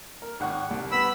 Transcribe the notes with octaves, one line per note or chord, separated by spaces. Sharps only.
A#4
G#1 F#5 C#6
C2
B3 B5 E6